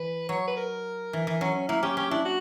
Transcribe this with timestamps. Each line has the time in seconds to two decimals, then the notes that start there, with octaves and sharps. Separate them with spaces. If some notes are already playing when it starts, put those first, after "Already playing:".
Already playing: E3 B4
0.29 F#3 C#5
0.47 B4
0.57 A#4
1.13 E3
1.27 E3
1.41 F#3 C#4
1.55 C#4
1.68 A#3 E4
1.83 C#4 G4
1.97 C#4 G4
2.11 D4 E4
2.25 F#4